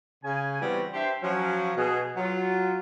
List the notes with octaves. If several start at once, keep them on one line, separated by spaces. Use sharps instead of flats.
C#3 G#5
E3 G3 B3 C4 F#4
D4 G4 C5 E5 C6
F3 F#3 C#4
B2 G#4
F#3 F4